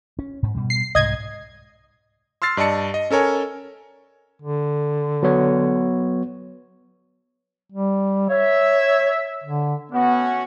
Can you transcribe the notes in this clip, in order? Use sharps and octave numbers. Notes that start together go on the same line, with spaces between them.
C#4
G#2
B2 G3
C7
C2 G#2 D#5 G#6
C6 E6 F6 A6 C7
G2 D5 D#5 A5 C#7
D#5
C#4 A4 A#4 C#5 G#5
D3
F#3 B3 C#5
G3
C#5 E5
D3
A3 B3 C#4 F#4